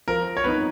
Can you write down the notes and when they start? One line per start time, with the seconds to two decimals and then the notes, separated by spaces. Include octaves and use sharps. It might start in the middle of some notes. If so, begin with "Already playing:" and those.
0.08 F3 A#4
0.37 C#5
0.44 B3 D#4 B4